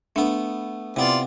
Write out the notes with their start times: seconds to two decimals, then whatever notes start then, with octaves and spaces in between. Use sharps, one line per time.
0.16 A3 B3 D4
0.96 C3 B3 E4 F4 D5